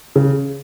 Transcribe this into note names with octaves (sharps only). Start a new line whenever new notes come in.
C#3